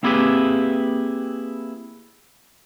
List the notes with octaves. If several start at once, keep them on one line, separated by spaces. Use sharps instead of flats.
A#3 C4 E4 G4 G#4 B4